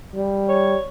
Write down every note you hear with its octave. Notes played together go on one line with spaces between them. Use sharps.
G3
C#5